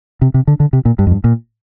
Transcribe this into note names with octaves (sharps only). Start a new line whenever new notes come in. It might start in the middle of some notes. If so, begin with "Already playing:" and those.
C3
C3
D3
D3
C3
A#2
G2
F2
G2
A#2